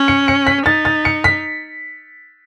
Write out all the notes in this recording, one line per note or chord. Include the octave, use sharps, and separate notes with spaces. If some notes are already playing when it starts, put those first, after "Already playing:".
Already playing: C#4
C#7
C#7
B6
D#4 A6
A6
C#7
B6